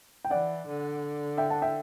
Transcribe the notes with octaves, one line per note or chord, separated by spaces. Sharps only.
G5
E3 D5 F#5
D3
E5 G5
F#5 A5
E5 G5